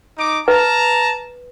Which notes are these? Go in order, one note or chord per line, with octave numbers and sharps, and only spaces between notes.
D#4 D6
B4 A5 A#5